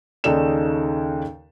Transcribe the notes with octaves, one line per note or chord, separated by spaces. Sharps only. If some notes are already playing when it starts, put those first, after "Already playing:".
D#2 C#3 D#4 A4 D5 E7